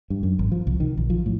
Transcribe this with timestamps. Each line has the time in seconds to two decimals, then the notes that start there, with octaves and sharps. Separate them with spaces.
0.10 G2
0.23 F#2
0.39 G#1
0.52 F3
0.67 C2
0.80 D#3
0.97 A#1
1.10 F3
1.26 A2